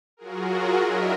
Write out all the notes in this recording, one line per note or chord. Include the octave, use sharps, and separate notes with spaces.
F#3 F4 F#4 G#4 A#4
F#3 D4 E4 A#4 D#5 E5